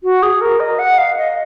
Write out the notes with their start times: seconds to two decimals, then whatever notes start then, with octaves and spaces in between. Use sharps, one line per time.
0.04 F#4
0.23 G#4
0.41 A#4
0.60 D#5
0.79 F#5
0.98 F5
1.17 D#5